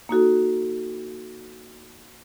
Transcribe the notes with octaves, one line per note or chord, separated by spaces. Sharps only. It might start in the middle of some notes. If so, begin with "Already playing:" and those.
A#3 D#4 F#4 A4